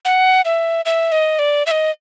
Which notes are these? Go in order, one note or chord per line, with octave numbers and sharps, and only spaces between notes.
F#5
E5
E5
D#5
D5
E5
D#5